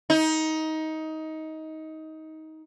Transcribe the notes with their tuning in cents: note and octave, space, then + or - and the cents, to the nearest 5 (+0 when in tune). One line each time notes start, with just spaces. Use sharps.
D#4 +20